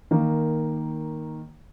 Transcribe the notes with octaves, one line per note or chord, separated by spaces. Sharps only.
D#3 A#3